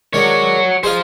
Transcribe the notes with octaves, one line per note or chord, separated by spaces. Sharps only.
D#3 G#3 D4 F#4 C#5
G#4 C5 D#5 F5 A#5